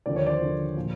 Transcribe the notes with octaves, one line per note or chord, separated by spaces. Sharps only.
D#2 D3 F3 D5
C#5
C5 D5
D#2 D3 F3
A#2 F3